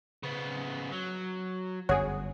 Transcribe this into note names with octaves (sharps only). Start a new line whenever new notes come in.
C#3 B3
F#3
G1 F#2 F#4 G#4 C#5